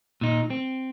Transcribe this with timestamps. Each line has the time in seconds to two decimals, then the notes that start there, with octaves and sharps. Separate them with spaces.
0.21 A#2 D#4
0.50 C4